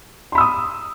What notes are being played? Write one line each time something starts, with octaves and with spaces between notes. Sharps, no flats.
B5 C6 D#6 E6